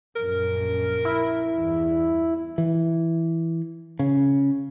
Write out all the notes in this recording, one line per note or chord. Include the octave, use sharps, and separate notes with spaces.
A#1 F#2 A#4
E4
E2 G2
E3
C#3